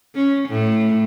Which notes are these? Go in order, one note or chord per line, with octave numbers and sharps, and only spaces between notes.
C#4
A2